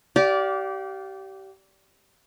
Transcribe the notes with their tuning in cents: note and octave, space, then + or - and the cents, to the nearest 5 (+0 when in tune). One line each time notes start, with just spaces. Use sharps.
G4 -25 D5 -15 F5 +20